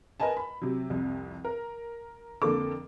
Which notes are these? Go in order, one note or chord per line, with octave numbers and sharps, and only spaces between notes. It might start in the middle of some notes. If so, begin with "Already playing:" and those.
A#4 B4 D#5 G#5 A5
B5
C3 F#3
C2 F2
A#4
F2 D3 A#3 A4 D6